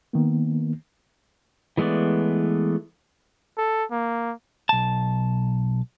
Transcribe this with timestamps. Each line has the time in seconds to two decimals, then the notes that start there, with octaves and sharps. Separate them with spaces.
0.13 D#3 A#3 B3
1.77 E3 G#3 A3 B3 D5
3.58 A4
3.91 A#3
4.69 B1 A5